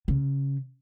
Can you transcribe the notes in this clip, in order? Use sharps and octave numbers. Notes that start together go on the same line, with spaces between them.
C#3